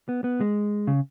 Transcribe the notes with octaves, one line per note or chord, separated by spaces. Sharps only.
B3
B3
G#3
C#3